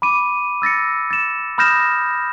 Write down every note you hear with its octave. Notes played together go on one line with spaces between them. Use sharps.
B5 D6 D#7
E6 A6 A#6 C#7
A6 E7
B5 D#6 F6 G6 A#6 E7